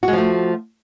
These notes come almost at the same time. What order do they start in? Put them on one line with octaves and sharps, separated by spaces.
F#4 G#3 F3 A3